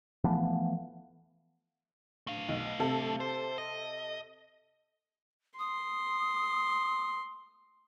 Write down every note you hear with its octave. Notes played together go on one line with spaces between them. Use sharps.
E3 F3 A3 B3
A3 F5
B1
C3 A4
C5
D#5
C6 D#6